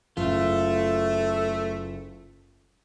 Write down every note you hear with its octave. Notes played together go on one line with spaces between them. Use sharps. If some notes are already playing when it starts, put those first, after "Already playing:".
F#1 A3 F4